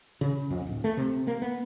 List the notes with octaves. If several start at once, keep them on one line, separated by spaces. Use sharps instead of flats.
C#3
F2
D1
A3
C3
A#3
B3